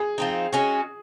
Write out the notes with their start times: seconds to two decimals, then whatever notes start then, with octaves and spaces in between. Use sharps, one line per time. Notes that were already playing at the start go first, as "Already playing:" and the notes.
Already playing: G#4
0.18 F3 C4 D#4
0.53 G#3 C#4 F#4